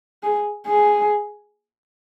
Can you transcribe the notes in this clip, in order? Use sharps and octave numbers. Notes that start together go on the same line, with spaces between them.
G#4
G#4